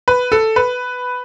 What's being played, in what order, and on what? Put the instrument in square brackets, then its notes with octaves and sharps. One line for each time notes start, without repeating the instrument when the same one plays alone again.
[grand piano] B4
A4
B4